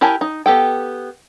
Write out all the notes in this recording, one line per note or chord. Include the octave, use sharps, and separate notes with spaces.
E4 G4 A#4 G#5 A5
D#4
B3 G4 A4 G5